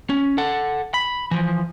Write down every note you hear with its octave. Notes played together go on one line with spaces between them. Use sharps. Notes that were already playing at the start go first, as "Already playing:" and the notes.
C#4
A4 F#5
B5
E3 F3